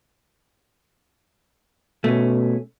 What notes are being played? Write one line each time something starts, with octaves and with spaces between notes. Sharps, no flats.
B2 A3 C#4